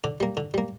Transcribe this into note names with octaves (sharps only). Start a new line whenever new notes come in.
D3 D5
G3 A#3
D3
G3 A#3